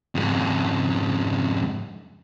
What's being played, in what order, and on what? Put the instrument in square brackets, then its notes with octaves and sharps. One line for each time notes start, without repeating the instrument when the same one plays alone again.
[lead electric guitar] F2 G#2